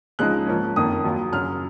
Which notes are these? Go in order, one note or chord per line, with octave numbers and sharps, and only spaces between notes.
C#2 C#3 F3 G#3 D#4 F#6
G#2 F3 A#3 C#4
F#1 F2 D#3 A#3 D#6
D#2 D#3 F#3
F#2 C#3 F#3 F6